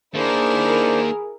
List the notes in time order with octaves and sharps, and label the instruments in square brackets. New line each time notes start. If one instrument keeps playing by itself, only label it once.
[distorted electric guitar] D#3 A#3 [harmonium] D4 C5 [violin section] E4 A#4 [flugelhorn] G#4